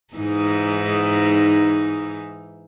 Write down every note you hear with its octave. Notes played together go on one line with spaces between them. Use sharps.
G#2 E3 D#4